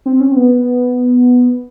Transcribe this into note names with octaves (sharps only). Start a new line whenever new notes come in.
C4
C#4
C4
B3